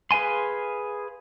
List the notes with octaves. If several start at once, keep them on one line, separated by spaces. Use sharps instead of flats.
G#4 B4 F5 G#5 C6